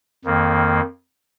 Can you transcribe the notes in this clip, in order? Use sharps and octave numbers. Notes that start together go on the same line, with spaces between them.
F2 D#3 A#3